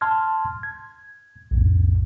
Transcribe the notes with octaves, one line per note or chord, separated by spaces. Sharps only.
A5 C6 F6 G#6
G#6
B1 F2 A2